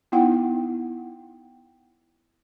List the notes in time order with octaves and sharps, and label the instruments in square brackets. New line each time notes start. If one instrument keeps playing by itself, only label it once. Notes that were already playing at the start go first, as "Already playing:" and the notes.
[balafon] B3 D#4 E4 F#5 G5